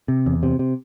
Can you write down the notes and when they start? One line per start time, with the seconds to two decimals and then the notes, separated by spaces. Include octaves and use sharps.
0.08 C3
0.26 E2
0.43 C3
0.59 C3